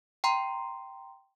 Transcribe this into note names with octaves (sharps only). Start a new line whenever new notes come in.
G5 A#5 C6